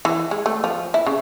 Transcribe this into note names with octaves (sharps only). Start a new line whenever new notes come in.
E3
G#3
A3
F3
E4
C#3